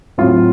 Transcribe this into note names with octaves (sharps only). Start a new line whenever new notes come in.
A2 F#3 C4 F4